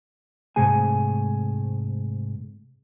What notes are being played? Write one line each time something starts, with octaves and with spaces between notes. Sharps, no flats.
G#2 C3 A3 G#4 G#5